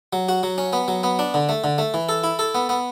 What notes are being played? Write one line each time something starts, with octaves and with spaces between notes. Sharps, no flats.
F#3
F#4
F#3
C#4
B3
F#3
B3
D4
D3
A3
D3
A3
E3
A4
E4
A4
B3
B3